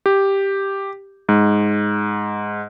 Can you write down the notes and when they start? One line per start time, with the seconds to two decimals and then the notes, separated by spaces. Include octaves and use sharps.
0.06 G4
1.29 G#2